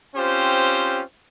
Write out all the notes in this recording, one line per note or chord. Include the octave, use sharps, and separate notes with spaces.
C4 C#4 F4 G4 C5